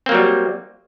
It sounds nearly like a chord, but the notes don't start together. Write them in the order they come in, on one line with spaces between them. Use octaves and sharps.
C4 A#3 F#3 G3